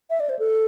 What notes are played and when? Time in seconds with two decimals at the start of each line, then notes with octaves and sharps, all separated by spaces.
0.10 E5
0.20 D5
0.29 C5
0.39 A4